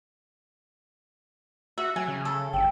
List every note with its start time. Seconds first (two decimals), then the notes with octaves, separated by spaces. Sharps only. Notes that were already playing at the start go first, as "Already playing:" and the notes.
1.78 F#4 E5
1.96 F#3 G#5
2.08 C#3
2.25 A4
2.53 G1 G5